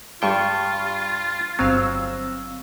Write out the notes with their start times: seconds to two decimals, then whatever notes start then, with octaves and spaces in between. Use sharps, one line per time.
0.22 G2 G3 F4 G5 C#6
1.59 G1 F#3 C4 F5 E6